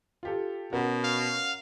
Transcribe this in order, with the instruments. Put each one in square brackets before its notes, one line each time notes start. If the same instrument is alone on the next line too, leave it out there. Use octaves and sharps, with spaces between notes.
[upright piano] F4 G4 A4
[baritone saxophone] B2 [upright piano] C#4 F#4 A#4
[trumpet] F5